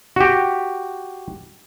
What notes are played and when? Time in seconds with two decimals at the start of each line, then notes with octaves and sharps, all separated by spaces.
0.16 F#4 G4